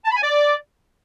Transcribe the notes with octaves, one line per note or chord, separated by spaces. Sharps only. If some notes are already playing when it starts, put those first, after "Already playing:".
A5
B5
G#5
D5